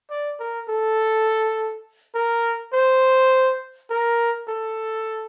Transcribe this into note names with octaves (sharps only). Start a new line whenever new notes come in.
D5
A#4
A4
A#4
C5
A#4
A4